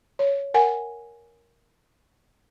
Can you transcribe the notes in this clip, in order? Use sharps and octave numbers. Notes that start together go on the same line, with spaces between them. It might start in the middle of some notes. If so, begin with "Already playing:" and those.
C#5
A#4 F#5 G#5